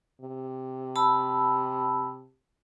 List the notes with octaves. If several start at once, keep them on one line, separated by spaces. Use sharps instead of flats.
C3
A5 B5 E6